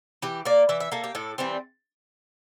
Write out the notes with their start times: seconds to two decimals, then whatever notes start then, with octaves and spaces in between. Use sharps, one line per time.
0.22 E3 G4
0.45 A#3 D5
0.69 E3 E5
0.80 E5
0.92 A#3 A4
1.04 G4
1.15 A2 A4
1.38 E3 G3 C4